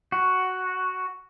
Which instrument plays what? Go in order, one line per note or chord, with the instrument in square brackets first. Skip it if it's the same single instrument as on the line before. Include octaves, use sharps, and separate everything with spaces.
[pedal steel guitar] F#4